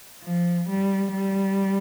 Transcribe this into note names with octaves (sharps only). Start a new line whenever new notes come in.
F3
G3
G3